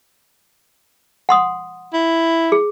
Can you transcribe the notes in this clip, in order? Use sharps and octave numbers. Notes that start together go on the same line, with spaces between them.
F#5 C6 D#6
E4
G#4